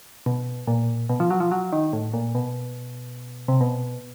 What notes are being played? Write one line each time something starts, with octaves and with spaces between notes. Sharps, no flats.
B2
A#2
B2
F3
F#3
F3
F#3
D#3
A2
A#2
B2
C3
B2